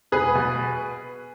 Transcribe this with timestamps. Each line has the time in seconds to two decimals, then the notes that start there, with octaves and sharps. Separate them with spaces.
0.12 E1 G#4 B4
0.35 B2